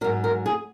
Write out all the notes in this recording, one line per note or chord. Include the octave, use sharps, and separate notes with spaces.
G#2 F#3 A#4
A#4
G#4